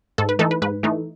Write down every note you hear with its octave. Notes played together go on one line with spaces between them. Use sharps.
G#2 A4
B4
E3 A3 D#4 A4
B4
G#2 B4
E3 A3 D#4